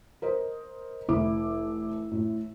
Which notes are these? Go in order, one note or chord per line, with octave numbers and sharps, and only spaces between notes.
A#4 C5 D#5
F1 E4 D6
A2